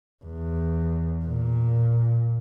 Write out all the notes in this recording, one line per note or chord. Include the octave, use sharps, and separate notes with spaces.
E2
A#2